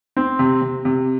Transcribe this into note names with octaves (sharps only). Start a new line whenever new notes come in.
C4
C3
C3
C3